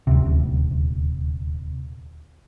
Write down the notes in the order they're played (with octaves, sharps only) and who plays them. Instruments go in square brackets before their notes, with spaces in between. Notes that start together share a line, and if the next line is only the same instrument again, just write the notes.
[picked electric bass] D#1 G#1 D2 C3